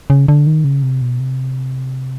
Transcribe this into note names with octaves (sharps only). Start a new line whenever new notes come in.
C#3
D3
D#3
C#3
C3
B2
C3